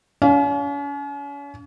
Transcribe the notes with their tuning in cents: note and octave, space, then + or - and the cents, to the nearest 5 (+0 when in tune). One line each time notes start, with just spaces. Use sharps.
C#4 +40 F5 +0